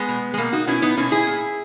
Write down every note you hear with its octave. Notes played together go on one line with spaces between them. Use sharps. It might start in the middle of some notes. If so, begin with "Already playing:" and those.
Already playing: G#3 B3
B2
G#3
B2 A#3
D#4 F#4
B2 C#4 E4
B3 D#4
B2 A#3 C#4
E4 G#4
A#2